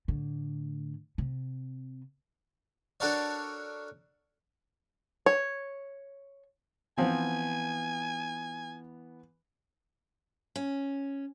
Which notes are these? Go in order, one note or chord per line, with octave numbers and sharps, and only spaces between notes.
A2 D3
C3
D4 F#4 A4 A#4 C#5 D5
C#5
E3 F3 B3 C4 G#5
C#4